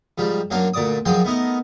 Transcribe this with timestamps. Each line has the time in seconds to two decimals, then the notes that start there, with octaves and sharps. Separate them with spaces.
0.18 G#2 F3 G3
0.51 F#2 F#3 A#3 D4 F5
0.74 D2 A#2 D5 D6 D#6
1.05 F#2 F3 F#3 G#3 G5 C6
1.25 A3 B3 D#4 A#4